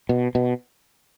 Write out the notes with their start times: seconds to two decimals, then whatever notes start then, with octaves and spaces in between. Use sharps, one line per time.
0.09 B2
0.35 B2